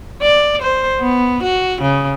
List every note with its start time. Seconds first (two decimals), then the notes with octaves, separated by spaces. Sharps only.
0.22 D5
0.61 C5
1.00 B3
1.43 F#4
1.81 C#3